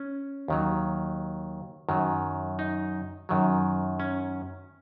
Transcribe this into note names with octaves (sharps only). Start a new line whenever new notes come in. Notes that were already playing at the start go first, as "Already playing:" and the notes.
Already playing: C#4
D#2 D#3 F#3
F#2 D#3 F#3
D#4
F#2 D#3 F#3
C#4